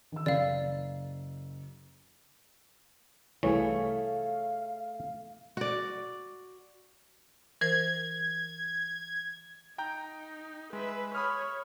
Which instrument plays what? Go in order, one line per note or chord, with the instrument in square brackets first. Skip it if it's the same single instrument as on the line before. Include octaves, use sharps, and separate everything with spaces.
[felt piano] D#3 E6
[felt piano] F#1 [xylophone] D5 F5
[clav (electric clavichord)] C2 E3 [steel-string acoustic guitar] A3 [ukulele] G#4 C#5 [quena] F5
[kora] F#4 D5
[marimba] E3 A#4 C5 [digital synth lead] G#6
[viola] D#4 [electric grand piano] G5 A#5 G6
[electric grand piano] G#3 [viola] B4 E5
[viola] C#5 [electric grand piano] B5 D#6 F6